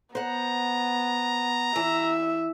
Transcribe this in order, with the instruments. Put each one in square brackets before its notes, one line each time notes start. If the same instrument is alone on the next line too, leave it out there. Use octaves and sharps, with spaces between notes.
[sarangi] B3 [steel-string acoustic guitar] C5 F#5 [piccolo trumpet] A#5
[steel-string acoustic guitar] E3 [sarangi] E5